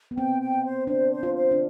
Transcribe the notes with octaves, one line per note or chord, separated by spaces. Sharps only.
B3
C4 G5
G5
C5
D4 C5
C5
F4
C5
D4